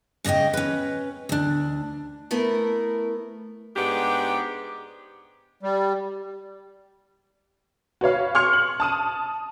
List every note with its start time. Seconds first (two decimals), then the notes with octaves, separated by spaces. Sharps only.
0.24 G#2 C#3 D5 D#5 G5
0.54 C#4 B4
1.29 D2 D4
2.31 A3 B3 E4 A#4
3.76 G#2 B3 D4 G4
5.63 G3
8.01 F#4 B4 C#5 F5
8.35 C6 C#6 F6 G#6 C#7 F7
8.53 F#7
8.80 A5 D#6 D#7